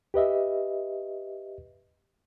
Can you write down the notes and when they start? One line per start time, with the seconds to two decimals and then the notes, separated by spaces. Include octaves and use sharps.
0.14 G4 B4 D#5 E5